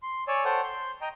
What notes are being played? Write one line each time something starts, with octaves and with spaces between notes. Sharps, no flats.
C6
C#5 D5 G#5 E6
A4 C5 C#5 F#5 G5 A5
C6 G6
D#5 G5 A#5